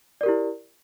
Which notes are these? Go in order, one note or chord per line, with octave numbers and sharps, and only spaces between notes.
E4 G4 A#4 D5